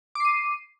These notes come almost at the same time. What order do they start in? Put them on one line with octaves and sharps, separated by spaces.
D6 C7 D#7